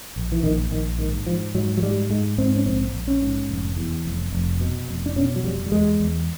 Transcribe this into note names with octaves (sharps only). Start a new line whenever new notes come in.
A#1
E3
A#1 D#3
A#1 D#3
G#2 D#3
G#2 F3
G#2 F#3
F#3
G#2 G3
G#2 G#3
G#2 C4
C#4
A#1 C4
A#1
C#4
G#2
F1
E2
F1
F1
B2
F1
D4
B2 C#4
F#3
F1 G3
G3
E2 G#3
E2